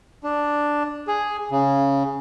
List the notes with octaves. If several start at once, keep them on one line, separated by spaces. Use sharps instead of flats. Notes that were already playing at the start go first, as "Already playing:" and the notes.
D4
G#4
C#3